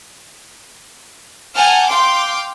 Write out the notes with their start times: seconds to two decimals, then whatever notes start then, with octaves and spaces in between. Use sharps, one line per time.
1.55 F#5 G#5 A5 F6 G6
1.86 F5 G5 C6 D6